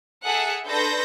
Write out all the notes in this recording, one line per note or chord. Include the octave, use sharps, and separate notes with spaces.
G#4 A4 E5 F#5 F#6
D4 A4 B4 C6 G6 A#6